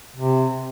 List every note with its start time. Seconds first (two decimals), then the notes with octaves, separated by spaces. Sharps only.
0.16 C3